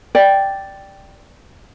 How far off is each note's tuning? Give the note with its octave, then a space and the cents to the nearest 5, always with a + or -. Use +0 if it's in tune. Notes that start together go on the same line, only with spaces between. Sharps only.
D5 +0 G5 +0